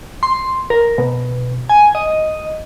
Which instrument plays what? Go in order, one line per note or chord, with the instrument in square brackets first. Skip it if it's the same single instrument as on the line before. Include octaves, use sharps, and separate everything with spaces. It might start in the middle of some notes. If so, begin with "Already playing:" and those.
[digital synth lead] C6
A#4
B2
G#5
D#5